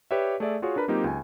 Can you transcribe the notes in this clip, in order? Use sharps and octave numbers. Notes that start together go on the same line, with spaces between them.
G4 B4 C#5 D5 E5
A3 G#4 D5 E5
F4 F#4 G#4 C#5
D4 A#4 B4 A#5 B5
F#3 A#3 C4 D#4 F4 G4
C#2 G#5